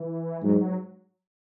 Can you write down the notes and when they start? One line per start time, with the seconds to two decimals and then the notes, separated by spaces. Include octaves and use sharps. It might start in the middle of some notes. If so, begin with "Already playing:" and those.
Already playing: E3
0.43 G#2 F#3
0.61 F#3